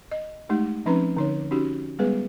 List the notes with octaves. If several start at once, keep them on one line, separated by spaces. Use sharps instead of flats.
D#5
G#3 A3 D#4 G4
F3 C4 C#4 D#4 B4 A#5
D3 D#4 C#5
C#4 D#4 F#4 G4
G3 G#3 B3 G#4 B4